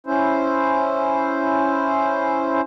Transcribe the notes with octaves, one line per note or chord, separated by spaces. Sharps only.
C#4 E4 C5